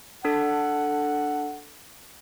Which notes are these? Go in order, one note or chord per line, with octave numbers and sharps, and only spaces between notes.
D4 A4 F#5